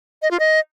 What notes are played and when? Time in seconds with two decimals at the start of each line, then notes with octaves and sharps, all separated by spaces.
0.22 D#5
0.31 F4
0.40 D#5